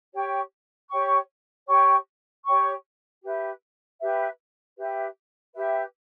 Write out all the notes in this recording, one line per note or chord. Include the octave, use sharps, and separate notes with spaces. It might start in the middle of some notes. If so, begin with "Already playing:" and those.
G4 C#5 G5 C#6
G4 C#5 G5 C#6
G4 C#5 G5 C#6
G4 C#5 G5 C#6
G4 B4 E5
G4 B4 E5
G4 B4 E5
G4 B4 E5